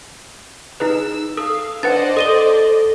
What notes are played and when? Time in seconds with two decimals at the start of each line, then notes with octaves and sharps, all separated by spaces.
0.80 D#4 G#4 B4 E6
1.37 A4 F5 D#6
1.83 D4 B4 C5 D5 D#5 F#5 A6
2.17 A4 D#6 D#7 G7